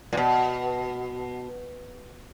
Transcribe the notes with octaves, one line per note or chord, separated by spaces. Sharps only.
A#2
B2